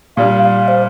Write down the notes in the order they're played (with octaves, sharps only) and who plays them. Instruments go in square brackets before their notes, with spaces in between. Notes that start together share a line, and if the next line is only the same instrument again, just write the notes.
[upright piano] A#2 G3 D4 [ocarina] F5
[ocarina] F5
C5